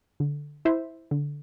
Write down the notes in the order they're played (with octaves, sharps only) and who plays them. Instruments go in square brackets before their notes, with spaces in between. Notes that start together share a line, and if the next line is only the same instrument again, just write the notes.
[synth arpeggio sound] D3
E4 C5 E5
D3